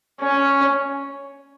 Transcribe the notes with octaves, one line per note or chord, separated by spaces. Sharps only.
C#4